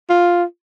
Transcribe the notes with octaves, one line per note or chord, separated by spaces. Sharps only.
F4